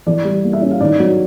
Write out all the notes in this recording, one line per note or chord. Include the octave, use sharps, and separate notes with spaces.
E3 D5
G3
A#3
E5
C#4
F5
D#3 D5
F#3